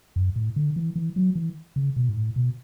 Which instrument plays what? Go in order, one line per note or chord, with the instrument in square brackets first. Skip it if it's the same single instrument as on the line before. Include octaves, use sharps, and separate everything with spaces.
[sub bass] F#2
A2
D3
E3
E3
F#3
E3
C#3
B2
G#2
A2
B2